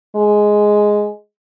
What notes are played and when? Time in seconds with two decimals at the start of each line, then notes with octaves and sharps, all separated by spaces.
0.16 G#3